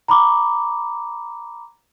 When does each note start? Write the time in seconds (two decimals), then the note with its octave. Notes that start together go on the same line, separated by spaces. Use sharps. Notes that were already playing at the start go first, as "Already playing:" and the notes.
0.08 A#5 B5 D6